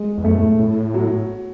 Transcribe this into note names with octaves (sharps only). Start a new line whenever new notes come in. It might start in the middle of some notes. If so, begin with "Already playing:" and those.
Already playing: G#3
E2
F#2 A3
A2
A2
F#3